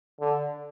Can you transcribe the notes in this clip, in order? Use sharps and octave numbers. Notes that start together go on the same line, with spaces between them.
D3